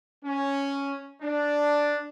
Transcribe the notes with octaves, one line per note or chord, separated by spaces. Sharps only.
C#4
D4